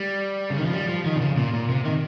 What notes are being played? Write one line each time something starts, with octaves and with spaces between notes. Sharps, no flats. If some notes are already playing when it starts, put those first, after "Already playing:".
Already playing: G3
C#3
D#3
F3
G3
F3
D#3
C3
C#3
A#2
A#2
C3
D#3